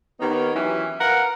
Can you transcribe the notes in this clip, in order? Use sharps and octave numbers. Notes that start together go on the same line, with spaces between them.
D#3 B3 D#4 G4 C#5
E3 F#3 C#4 E4 G4
A#4 B4 F5 F#5